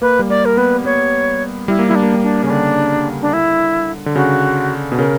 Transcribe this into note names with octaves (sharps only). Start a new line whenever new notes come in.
A#3 B4
G3
A#3 D5
A#4
B3 B4
B3 C#5
G3 E4
A#3
E4
G3 D4
A#3
G3
D4
C#3 C#4
D3 D4
D4
E4
D3
C#3 F#4
B2
C#3 A#4